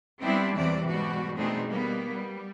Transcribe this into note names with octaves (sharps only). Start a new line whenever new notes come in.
G3 B3 C4 D4 E4
E2 C3 E3 F#3 D5
G#2 B2 G3 F#4
B2 A3 C4 D4 D#4 G#4
G3 A#3 B3
G3